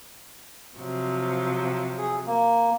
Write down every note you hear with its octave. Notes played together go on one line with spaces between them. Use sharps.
C3 F3 F#3
G#4
A#3